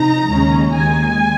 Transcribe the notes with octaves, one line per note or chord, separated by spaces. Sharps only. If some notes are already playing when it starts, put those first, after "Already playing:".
Already playing: C3 F3 D#4 A#5
D#2 C#3 G#3 C#4
D#2 D#3 G#3 G#5